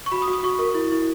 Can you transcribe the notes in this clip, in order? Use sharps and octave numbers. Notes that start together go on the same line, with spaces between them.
C#6
F#4 B5
D#6
F#4
D#6
F#4 C#6
A#4
E4
E4